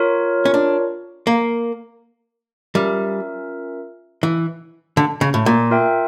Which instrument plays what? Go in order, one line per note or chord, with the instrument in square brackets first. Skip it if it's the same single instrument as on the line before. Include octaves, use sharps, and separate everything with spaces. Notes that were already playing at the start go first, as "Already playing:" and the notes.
Already playing: [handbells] F4 A#4 C#5
[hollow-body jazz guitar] C#4
D4
A#3
[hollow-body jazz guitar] G3 [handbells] C#4 F4 A#4 E5
[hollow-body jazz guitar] E3
D3
C#3
A2
A#2
[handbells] F4 A#4 E5 G5